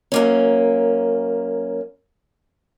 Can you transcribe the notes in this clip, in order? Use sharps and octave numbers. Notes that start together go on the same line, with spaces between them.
F#2 A#3 C#4